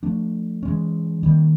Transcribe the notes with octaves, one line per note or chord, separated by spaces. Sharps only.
F3 A3 D4
E3 G#3 C#4
D#3 G3 A#3